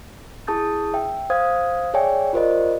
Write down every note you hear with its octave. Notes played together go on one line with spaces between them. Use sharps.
E4 G#4 A5 D#6 G6 A6
E5 G5
C5 F5 D#6 G#6
G#4 C#5 D5 E5 G5 G#5
F4 G4 A#4 C5 D5 D#5